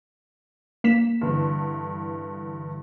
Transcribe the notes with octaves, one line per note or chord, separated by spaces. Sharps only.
A#3 B6 E7
G2 D3 E3